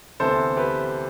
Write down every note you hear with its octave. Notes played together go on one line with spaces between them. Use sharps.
D2 C3 E3 B3 A4 C5
G4 B4